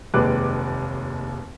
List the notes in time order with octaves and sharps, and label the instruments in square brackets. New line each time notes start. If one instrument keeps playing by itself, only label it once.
[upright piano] F1 D#2 G#3 B4 D6 F#6